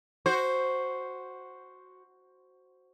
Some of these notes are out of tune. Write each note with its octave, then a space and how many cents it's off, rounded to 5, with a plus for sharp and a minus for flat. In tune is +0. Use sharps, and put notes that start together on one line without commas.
F#4 +0 C5 +0